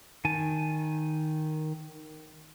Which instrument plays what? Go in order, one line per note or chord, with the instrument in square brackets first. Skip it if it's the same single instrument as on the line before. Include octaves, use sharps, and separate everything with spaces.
[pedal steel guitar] D#3 G#5 A5